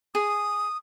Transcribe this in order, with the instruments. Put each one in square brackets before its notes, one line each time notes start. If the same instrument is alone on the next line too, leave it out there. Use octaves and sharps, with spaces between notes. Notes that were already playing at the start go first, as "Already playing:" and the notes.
[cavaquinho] G#4 [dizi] D#6